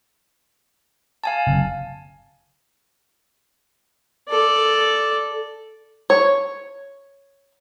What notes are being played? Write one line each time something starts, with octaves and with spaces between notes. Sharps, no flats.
F5 G#5 A5
F#1 C3
A4 D5
C#5